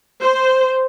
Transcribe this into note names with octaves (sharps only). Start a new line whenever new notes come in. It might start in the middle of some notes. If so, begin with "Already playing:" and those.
C5